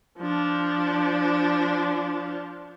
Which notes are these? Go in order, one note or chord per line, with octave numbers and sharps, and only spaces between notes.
F3 D4